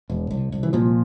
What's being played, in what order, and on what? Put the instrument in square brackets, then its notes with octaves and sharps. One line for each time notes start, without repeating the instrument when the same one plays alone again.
[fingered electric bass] E1
C2
C2
E3
A#2 F3